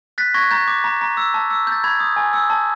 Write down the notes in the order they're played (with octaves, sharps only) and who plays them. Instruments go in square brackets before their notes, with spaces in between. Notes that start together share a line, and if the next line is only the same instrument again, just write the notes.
[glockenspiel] F#6 A6 B6
C#6 G#6 A#6
A#5 G6 A6
D6
A#5
A#5
E6
A5
E6
G6 A6
B5 G#6
D#6
G#5
E6
A5